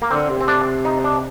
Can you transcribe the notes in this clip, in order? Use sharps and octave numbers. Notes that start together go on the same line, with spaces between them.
A#3
D3 C4
C3
C4
D4
D#4
D4